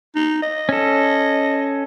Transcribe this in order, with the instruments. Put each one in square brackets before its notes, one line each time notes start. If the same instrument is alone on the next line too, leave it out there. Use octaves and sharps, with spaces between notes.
[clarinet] D#4
D#5
[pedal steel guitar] C#4 A4